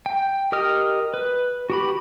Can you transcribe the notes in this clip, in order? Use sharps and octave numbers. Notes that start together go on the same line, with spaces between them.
G5
G4 A#4 D#5 D#6 F6
B4
F#4 G4 B5